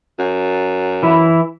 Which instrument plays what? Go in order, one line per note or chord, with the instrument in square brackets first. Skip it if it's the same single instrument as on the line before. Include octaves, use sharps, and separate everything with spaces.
[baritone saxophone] F#2
[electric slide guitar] E3 E4